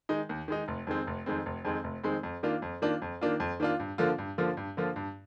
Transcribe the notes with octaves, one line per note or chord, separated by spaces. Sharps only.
D#3 G#3 D#4
D#2
D#3 G#3 D#4
F1
F2 D#3 G#3 C4
F1
F2 D#3 G#3 C4
F1
F2 D#3 G#3 C4
F1
F2 D#3 G#3 C4
F2
D#3 A#3 D4 F4
F2
D#3 A#3 D4 F4
F2
D#3 A#3 D4 F4
F2
D#3 A#3 D4 F4
G2
D3 F3 A#3 F4
G2
D3 F3 A#3 F4
G2
D3 F3 A#3 F4
G2